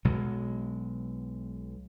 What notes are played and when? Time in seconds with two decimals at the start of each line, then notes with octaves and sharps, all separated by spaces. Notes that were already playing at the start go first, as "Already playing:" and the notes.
0.05 B1 B2 F#3 G#3